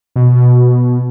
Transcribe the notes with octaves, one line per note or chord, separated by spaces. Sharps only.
B2